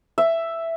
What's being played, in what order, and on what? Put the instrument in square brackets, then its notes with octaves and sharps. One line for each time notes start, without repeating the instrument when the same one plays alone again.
[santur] E5